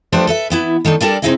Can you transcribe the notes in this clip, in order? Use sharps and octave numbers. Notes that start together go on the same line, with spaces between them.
F3 A3 D4 G4 B4 C5
A4 B4 E5
E3 B3 E4
D#3 A3 D4 D#4
G3 D4 A4 A#4 D5
C3 G#3 D#4 E4 G#4 D#5